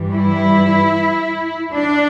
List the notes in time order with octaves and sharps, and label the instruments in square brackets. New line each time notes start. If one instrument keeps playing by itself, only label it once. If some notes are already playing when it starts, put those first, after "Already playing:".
Already playing: [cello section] G2 E3 G3
E4
D4